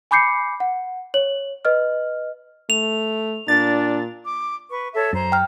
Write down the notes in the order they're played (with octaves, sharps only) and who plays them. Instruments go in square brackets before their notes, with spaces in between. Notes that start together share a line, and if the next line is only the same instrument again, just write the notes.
[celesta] G#5 B5 D6 G6 C7 C#7
F#5
C#5 F#7
B4 D#5 F6
[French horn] A3 [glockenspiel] F7
[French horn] A#2 [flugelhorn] D4 [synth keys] A6
[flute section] D6
B4 C#6
A4 C#5 E5
[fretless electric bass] F#2 [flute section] C5 A#5
[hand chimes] G5 F6